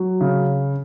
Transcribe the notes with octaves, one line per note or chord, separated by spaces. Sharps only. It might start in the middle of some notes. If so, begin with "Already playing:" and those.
Already playing: F#3
C#3